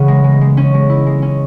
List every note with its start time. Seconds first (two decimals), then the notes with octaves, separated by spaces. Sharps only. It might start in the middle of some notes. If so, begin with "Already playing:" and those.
Already playing: C#3 E3 B3 C#4
0.08 G#3
0.24 G#3
0.41 G#3
0.57 C#4
0.74 G#3
0.89 E4
1.06 G#3
1.22 C#4